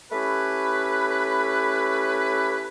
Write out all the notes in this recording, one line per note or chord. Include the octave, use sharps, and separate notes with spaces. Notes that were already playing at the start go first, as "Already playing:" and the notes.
A3 C#4 E4 G4 B4